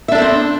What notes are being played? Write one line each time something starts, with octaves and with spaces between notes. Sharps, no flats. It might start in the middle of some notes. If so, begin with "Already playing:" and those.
B3 C4 D4 A4 E5